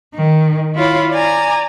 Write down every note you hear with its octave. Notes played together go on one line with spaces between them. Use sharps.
D#3
E4 F4 C#5 B5
D5 G#5 A#5